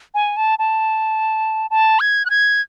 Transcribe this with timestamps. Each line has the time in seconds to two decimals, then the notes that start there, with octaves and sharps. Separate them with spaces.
0.14 G#5
0.37 A5
0.59 A5
1.70 A5
2.00 G#6
2.25 F#6
2.30 G#6